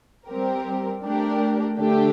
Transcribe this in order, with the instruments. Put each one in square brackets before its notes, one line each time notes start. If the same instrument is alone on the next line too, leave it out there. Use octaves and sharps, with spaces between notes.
[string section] G3 C4 G4 A#4
A3 D4 G4 A#4
D3 A3 D4 G4